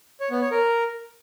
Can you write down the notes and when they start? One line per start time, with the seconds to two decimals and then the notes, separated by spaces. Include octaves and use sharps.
0.20 C#5
0.31 B3
0.41 C#5
0.51 A#4